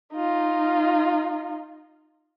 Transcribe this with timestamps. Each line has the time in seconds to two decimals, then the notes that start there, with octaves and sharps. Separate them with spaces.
0.13 D#4 F4